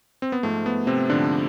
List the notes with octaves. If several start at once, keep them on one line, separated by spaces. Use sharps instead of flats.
C4
B3
G#2 F3 A3
B3
C3 C4
G#2 D3 F3 D4